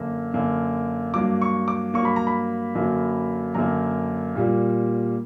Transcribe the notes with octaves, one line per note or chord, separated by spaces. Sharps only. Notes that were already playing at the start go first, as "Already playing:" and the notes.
Already playing: F#2 D3 A#3
F#2 D3 A#3
G2 F#3 A#3 D6
C#6
D6
G2 F#3 A#3 C#6
B5
A#5
B5
F#2 D3 F#3 A#3
F#2 D3 F#3 A#3 A#5
A#2 G3 A#3